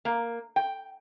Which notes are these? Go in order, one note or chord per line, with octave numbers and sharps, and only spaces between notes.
A#3
G5